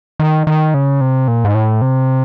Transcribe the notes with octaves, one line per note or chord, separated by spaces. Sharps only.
D#3
D#3
C#3
C3
A#2
G#2
A2
C3